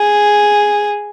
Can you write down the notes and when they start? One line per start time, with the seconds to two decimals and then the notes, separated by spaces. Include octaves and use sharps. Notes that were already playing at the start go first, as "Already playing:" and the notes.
Already playing: G#4